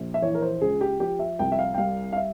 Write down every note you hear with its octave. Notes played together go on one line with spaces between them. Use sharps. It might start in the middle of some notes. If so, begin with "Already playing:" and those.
Already playing: A#1 F3
E5
E3 C#5
A#4
C5
C#2 G#4
G4
F3 G4
E5
C2 G5
E5
F5
G5
G3 F5
F5
E5